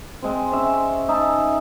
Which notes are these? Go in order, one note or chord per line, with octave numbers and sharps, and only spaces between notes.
G#3 C4
C#4 E5
D#4 G#4 E5 A5